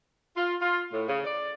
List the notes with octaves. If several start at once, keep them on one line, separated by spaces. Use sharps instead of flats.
F4
F4
A2
C#3
D5